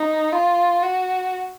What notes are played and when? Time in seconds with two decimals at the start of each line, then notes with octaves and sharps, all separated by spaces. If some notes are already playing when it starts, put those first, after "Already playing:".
Already playing: D#4
0.33 F4
0.83 F#4